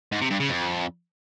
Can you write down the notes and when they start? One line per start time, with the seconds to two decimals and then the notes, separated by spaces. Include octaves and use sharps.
0.12 G#2
0.21 C3
0.30 G2
0.40 C#3
0.49 F2